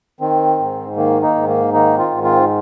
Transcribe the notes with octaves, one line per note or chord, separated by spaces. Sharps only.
D#3 C4
G#2
D#3 A#3
A#3 D#4
G#2
A#3
D#3 A#3 D#4
C4 F4
G#2
C4 F4